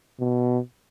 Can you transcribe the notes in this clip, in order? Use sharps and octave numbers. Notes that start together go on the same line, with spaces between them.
B2